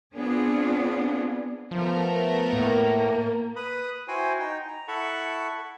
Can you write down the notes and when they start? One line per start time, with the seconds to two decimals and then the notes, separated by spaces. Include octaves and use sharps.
0.15 B3 C4 D4 F4 G#4
1.71 F3 A3 B3 A#4
2.53 A2 A#3
3.56 B4 B5 D#6
4.08 E4 F#4 C5 G5 G#5
4.40 D#4 G5
4.68 A#5
4.88 E4 A4 F#5 A5 B5 C#6